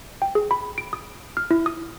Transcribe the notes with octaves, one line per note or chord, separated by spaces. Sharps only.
G5
G#4
B5
D7
D#6
F6
E4
D#6